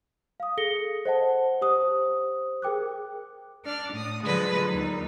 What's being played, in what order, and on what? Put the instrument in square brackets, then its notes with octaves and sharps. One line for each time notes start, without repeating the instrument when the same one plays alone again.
[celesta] F5 D#6
G#4 A4 A#6 C#7 G7
C5 D#5 F#5 A5
G4 C5 D#6
G#4 A#4 G5 D6 F#6
[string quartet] D4 D5 F6
A2 D#6
D3 F3 F#3 G#3 D4 B4
D#2 D#4